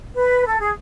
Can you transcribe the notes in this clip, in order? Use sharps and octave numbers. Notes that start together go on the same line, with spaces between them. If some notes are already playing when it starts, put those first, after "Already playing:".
B4
A4
G#4